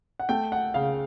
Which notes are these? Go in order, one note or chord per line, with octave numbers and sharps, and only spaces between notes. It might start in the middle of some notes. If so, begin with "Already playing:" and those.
F#5
A3 G5
F#5
C#3 F5